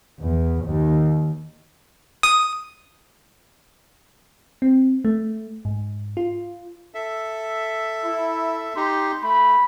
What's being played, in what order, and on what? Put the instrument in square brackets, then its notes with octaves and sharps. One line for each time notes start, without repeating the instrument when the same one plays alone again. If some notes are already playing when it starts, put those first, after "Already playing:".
[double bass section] E2
D#2
[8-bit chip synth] D#6
[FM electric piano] C4
A3
G#2
F4
[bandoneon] A4 E5
[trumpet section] E4
[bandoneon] D#4 G4 [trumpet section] C6
[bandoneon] A3 [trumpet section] B5